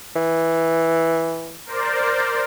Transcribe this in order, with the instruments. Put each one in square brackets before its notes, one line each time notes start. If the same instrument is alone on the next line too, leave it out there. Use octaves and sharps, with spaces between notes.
[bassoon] E3
[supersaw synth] A#4 C5 D5